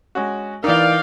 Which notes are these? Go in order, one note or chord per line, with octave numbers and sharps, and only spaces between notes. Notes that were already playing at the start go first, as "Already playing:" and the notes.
G#3 C#4 F#4
E3 D#4 A#4 D5 F5 G5